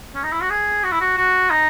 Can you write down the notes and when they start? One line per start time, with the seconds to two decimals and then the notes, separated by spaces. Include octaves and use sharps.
0.15 C#4
0.23 D#4
0.33 E4
0.41 F#4
0.50 G#4
0.84 F#4
0.92 E4
1.01 F#4
1.17 F#4
1.50 D#4